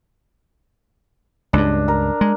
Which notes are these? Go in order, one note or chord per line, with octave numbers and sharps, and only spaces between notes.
C#2 G2 D4
A#4
G#3